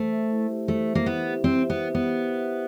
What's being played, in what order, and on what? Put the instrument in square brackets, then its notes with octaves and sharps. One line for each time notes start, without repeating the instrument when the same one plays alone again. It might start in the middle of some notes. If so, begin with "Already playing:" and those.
Already playing: [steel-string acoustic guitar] A3 [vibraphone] C5
[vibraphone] E5
E4
G4
[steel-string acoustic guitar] A3 [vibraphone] C5
[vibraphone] E5
[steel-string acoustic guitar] A#3
[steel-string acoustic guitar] B3 [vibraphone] E4
[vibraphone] G4
[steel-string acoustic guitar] C4 [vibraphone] C5
[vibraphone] E5
[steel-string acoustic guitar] B3
[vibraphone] E4
[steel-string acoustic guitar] B3
[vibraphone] G4
C5
E5